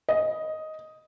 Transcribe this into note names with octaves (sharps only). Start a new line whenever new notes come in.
D#5